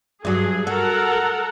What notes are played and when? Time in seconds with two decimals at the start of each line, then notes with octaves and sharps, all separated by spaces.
0.25 G2 F#3 G#4
0.67 F#4 A4 A#4 F#5